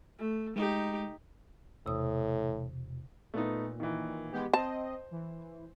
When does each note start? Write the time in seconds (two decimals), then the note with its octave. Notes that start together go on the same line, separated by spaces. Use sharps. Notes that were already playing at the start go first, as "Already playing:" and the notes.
0.18 A3
0.56 G#3 D#4 G4
1.86 E1 A2 C3 D#6
3.34 A#2 A3 B3 D#4
3.80 D#3 E3
4.32 G#3 B3 G4
4.54 C4 C5 D#5 A5
5.11 E3